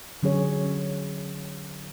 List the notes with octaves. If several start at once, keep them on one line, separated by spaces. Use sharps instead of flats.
D3 F#3 C#4 G#4 C#5